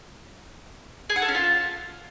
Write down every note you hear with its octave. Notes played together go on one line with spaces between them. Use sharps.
G#4
F#5
A4
C#4
F4